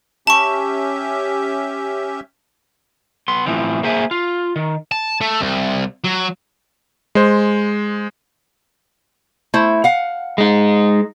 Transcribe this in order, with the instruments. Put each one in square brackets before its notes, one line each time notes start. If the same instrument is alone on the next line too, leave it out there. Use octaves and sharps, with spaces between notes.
[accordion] C#4 G4 E5 [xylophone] A5 C#6
[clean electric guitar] B3 C6
A2 E3 F3 C4
A#3 G#4 C5 E5 G#5
F4
D#3
[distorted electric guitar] A5
A3
C2
F#3
[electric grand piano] G#3 C5
[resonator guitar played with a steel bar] A3 E4 C5
F5 F#5
[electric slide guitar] G#3 D#4